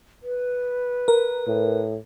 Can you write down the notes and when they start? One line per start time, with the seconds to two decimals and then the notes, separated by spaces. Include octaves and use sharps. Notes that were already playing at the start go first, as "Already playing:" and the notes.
0.23 B4
1.08 A#4
1.47 A2